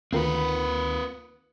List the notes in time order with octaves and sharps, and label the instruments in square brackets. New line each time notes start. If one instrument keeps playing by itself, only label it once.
[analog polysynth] D2 D#3 B5 [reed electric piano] A#3 F4 A#4 [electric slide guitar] C4 B4